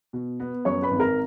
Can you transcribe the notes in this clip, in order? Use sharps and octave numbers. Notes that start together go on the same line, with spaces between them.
B2
B3
F#2 C#5 C#6
B4 B5
G#1
A#4 A#5